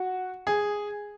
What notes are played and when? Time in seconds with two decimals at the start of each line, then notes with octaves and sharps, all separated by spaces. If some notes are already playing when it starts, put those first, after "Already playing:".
Already playing: F#4
0.47 G#4